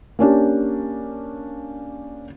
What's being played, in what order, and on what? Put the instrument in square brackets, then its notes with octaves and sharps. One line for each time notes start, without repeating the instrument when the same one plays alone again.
[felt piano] A#3 C#4 D4 G4